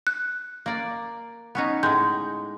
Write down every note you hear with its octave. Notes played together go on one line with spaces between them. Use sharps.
F#6
A#3 D5
B3 C#4 D#4
A2 G#3 G6